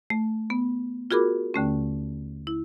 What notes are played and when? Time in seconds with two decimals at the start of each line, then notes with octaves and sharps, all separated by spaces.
0.10 A3
0.50 B3
1.11 F4 F#4 G#4 A#4 B5 D6
1.54 D#2 D3 A3 C#4
2.47 E4